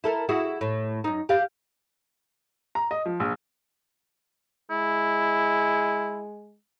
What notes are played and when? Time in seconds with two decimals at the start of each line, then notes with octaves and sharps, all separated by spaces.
0.04 E4 A4 A#4
0.29 E4 F#4 G#4
0.61 A2
1.04 F#2 D#4
1.29 G4 F5
2.75 A#5
2.91 D#5
3.06 F3
3.20 A#1
4.70 G#3 E4